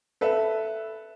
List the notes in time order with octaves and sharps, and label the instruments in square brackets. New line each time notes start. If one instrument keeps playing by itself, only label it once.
[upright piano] A4 B4 E5